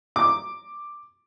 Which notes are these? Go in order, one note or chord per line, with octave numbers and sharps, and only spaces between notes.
D6